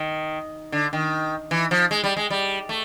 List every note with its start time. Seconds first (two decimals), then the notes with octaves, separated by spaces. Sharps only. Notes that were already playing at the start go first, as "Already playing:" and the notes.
Already playing: D#3
0.72 D3
0.93 D#3
1.51 E3
1.71 F3
1.91 G#3
2.04 G3
2.17 G#3
2.30 G3
2.69 A3